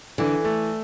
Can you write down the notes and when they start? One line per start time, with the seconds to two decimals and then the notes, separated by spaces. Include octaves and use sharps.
0.18 D3 E3
0.44 A3